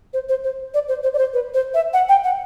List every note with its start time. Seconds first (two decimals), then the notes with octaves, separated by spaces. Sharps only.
0.13 C5
0.29 C5
0.44 C5
0.74 D5
0.88 C5
1.03 C5
1.13 D5
1.18 C5
1.34 B4
1.54 C5
1.74 E5
1.93 F#5
2.09 G5
2.24 F#5